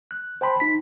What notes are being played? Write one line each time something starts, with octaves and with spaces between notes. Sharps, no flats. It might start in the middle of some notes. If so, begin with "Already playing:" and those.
F#6
C5 G5 A5 B5 C6
D#4 B6